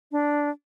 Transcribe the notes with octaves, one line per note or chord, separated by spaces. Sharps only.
D4